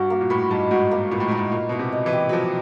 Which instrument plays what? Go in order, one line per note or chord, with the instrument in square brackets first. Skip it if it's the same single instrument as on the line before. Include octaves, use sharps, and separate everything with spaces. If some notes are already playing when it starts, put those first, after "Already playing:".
Already playing: [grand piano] G2 [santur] F#4
[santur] A#3
[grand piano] A#2
[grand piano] A2 [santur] B4
[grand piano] G2 [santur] D#4
[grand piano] G#2 [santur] F#4
[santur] A#3
[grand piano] A#2 [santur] B4
[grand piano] A2
[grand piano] G#2 [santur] D#4
[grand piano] A2
[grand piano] A#2 [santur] A#4
[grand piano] B2 [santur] E4
[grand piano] C3
[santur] D#5
[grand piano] E3
[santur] G4
[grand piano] F#3
[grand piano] F3 [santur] A#4